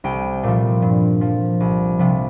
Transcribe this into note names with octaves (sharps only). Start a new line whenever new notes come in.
C2 G5
A#2 F3
G2
F3
C2
C3 F3